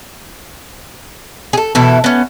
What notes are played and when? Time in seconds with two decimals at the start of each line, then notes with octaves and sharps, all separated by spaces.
1.53 G#4 A4
1.75 B2 E3 E4 A4
2.04 B3 C#4